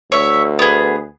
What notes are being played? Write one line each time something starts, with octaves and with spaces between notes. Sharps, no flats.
D2 C#5 E5
B3 G#4